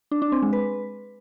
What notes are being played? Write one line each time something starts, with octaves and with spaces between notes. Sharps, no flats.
D4
D4
C4
G#3
B4